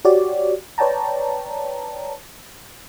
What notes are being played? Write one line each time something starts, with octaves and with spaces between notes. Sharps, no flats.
F#4 G4 C#5 D5
B4 C#5 D5 G5 A5 A#5